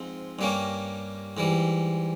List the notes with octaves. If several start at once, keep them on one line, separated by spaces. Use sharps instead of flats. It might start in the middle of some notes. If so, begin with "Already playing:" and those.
Already playing: G#2 F3 C4
G2 G3 A#3 C#4
G#2 E3 G3